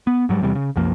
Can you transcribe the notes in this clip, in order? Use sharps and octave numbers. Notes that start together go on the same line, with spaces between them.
B3
G#2 F#3 G3
E2 C3 G3
C#3
C2 F#2 F3 A#3